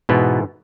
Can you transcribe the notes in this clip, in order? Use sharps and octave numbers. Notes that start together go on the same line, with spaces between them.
G#2 B2 E3 B3